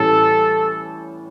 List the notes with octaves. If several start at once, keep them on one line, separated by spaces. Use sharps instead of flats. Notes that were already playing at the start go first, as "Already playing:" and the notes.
Already playing: A2 E3 G3 C#4 A4